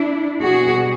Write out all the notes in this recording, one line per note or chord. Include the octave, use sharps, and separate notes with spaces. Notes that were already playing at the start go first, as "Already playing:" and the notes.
Already playing: D4 E4
B2 G3 F#4 G#4